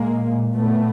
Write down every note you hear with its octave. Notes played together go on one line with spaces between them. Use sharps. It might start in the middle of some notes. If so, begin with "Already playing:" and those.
Already playing: A#2 G#3 A#3
A3 B3